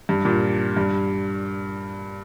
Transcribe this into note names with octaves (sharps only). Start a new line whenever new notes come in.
G2
A#2
G2